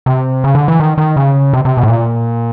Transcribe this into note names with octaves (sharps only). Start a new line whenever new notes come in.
C3
C#3
D3
E3
D#3
D#3
C#3
C3
C3
B2
A2
A#2